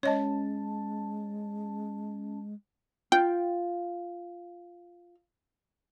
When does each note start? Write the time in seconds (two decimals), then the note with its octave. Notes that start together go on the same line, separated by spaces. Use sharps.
0.03 G#3 C#4 C#5 D#5 A5
3.12 F4 G5